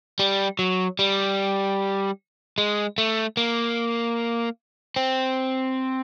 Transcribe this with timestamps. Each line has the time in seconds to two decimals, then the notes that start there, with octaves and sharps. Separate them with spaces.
0.19 G3
0.59 F#3
0.99 G3
2.58 G#3
2.98 A3
3.37 A#3
4.96 C4